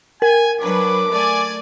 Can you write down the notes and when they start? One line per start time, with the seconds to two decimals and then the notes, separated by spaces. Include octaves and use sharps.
0.22 A#4 G#5
0.61 F#3 D4 B4 D6
1.11 A3 D5 G#5